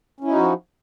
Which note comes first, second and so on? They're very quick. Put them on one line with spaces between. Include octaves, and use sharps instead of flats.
C#4 E4 D#4 F#4 F3